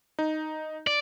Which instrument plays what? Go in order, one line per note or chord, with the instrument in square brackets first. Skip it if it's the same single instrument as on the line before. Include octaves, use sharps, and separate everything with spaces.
[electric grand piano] D#4
[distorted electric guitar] D5